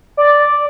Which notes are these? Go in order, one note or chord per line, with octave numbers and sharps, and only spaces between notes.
D5